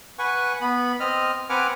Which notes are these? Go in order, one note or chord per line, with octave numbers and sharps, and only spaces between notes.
B4 F#5 G#5 C#6
B3 B5
C4 D#5 F6
C4 B4 F#5 G#5 D6 F6